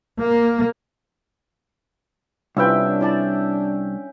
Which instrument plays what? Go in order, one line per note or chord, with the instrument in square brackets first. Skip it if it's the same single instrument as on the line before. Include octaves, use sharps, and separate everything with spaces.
[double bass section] A#3
[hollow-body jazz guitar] C2 [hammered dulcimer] C#4 E5 G5 [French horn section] D4 [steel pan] E4 F4 B4
[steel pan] E4 D5 A5